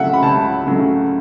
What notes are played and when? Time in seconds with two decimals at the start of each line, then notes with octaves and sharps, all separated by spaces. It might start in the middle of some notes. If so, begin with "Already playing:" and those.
Already playing: C#3 F#3 A3 E5 F#5
0.14 B5
0.23 C#2 A5
0.67 C#3 F#3 A3